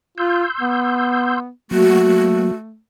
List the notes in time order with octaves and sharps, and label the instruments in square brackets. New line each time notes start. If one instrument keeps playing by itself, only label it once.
[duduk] F4 [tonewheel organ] C6 E6 G6
[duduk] B3
[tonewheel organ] F#3 A#3 [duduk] A3 [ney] F#4